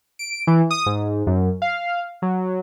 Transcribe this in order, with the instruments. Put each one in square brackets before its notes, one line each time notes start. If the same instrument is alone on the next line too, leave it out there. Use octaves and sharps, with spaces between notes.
[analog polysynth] D7
E3
D#6
G#2
F#2
F5
F#3